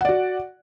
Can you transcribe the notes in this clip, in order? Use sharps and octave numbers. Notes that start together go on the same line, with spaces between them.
F#4 D5 F#5